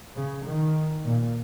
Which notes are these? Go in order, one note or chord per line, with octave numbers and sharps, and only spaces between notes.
C#3
D#3
A#2